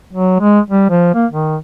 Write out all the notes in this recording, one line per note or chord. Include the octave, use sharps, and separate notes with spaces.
F#3
G#3
G3
F3
A#3
D#3